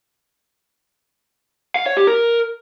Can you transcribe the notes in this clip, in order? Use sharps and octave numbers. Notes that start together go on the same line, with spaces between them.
F5
C#5
G4
A#4